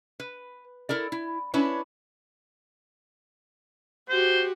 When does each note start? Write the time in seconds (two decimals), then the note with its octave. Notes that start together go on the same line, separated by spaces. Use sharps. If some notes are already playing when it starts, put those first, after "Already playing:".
0.20 B4
0.89 E4 A4 A#4 D5
1.12 E4
1.54 C#4 D4 E4 B4 C#5
4.09 F#4 G4 C5